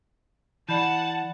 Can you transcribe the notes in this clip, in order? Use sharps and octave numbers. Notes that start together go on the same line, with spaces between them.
E3 D5 F#5 A5 B5 G6